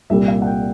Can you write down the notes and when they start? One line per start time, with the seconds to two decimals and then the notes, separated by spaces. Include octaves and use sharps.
0.10 C2 A#2 G3 E5
0.28 F5
0.42 F#5
0.46 G5